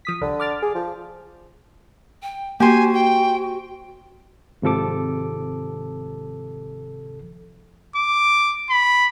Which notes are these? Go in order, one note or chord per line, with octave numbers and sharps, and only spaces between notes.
F3 D#6 B6
C2 D3
D6 F6 A6
G#4
F3
G5
A#3 F#4 G4 C5 G#5
G5
G#1 C3 F3 A4 D6
D6
B5